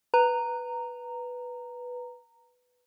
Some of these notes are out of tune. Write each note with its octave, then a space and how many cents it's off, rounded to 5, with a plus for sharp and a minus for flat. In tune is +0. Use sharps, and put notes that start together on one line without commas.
B4 +0 A#5 -10